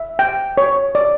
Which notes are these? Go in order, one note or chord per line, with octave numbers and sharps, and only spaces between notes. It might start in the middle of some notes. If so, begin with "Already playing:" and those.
Already playing: E5
G5
C#5
D5